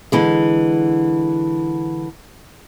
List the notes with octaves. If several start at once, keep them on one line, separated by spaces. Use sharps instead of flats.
D3 E3 G#3